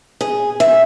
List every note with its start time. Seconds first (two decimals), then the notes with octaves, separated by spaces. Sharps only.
0.21 G#4
0.60 E5